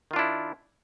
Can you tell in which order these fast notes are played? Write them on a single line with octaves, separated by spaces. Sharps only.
D#3 F4 D4 E4